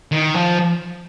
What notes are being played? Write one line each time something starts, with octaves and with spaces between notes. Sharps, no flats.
D#3
F3